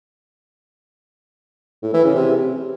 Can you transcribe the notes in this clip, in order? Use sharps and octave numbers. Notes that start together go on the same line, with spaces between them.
A2
E3
C#3
C3